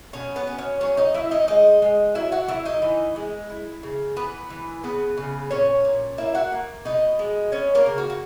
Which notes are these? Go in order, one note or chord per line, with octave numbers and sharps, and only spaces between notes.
B2 C#4 C#5
B3 B4
C#4
C#4 C#5
F#3 C#4 C#5
D#4 D#5
F#3 E4 E5
D#4 D#5
G#3 D#4 D#5
G#3
F#3 E4 E5
F#4 F#5
F#3 E4 E5
D#4 D#5
E3
G#3
E4
C#3
E3 B3 B4
E3
C#3 B3 B4
C#3
A#2 C#4 C#5
A#2
A#3 E4 E5
F#4 F#5
A#3
B2 D#4 D#5
G#3
B3 C#4 C#5
A#3 A#4
C#3
F#4
F#4